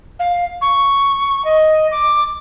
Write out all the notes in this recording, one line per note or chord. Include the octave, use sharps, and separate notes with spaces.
F5
C#6
D#5
D6